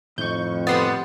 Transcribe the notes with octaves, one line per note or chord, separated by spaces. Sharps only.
F2 A2 D#3 C#6 G6
D3 G3 B3 C6 D#6 A6